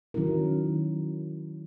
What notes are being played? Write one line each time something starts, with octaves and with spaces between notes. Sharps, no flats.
D#3 F#3 C#4 E4 A#4